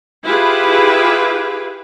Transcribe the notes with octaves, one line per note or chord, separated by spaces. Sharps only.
E4 F4 G4 G#4 B4